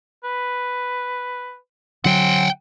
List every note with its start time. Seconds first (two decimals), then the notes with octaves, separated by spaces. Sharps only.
0.24 B4
2.05 D3 F#3 C4 F#5 G5